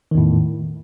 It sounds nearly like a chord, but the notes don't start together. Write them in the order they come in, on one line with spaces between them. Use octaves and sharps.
D#3 E2 A2